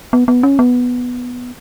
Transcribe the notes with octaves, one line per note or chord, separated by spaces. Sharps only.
B3
B3
C#4
B3